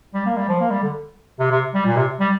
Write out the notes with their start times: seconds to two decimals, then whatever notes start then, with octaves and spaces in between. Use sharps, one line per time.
0.14 G3
0.26 A#3
0.37 G3
0.49 F3
0.60 A#3
0.71 G3
0.83 D3
1.40 C3
1.51 C3
1.74 G3
1.86 A#2
1.97 C3
2.20 G3